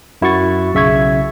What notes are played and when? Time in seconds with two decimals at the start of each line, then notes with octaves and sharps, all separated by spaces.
0.22 F#2 E4 F#4 E5 C#6 A6
0.74 B1 C#3 E5 C#6 G#6